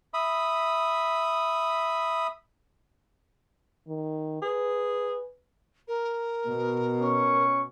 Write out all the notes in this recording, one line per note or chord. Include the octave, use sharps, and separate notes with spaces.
E5 B5 D#6
D#3
G#4 B4
A#4
B2
C#4 C#6